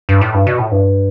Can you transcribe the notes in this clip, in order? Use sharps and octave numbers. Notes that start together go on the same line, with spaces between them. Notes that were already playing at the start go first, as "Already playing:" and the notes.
G2
A2
G2
B2
A2
G2